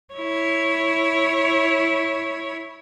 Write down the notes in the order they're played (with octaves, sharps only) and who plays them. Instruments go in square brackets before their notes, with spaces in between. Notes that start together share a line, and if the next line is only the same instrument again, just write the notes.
[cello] E4 C#5